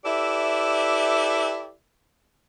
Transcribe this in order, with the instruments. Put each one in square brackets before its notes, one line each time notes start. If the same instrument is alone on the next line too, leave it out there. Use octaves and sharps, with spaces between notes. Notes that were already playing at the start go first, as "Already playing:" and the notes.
[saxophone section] E4 G4 A4 B4 D5 E5